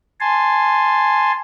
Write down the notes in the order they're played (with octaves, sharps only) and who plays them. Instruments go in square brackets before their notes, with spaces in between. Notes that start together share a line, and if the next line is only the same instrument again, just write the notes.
[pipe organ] G#5 A5 C6